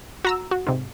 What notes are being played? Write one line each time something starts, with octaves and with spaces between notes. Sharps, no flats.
F#4 A#5 E6
F#4
G#2 C3